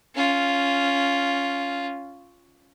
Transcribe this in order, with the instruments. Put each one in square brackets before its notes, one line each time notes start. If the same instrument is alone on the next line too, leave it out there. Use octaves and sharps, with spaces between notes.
[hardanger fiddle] C#4 F4